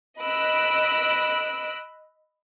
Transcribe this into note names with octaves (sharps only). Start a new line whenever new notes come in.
D#5 B5 E6 F#6 D7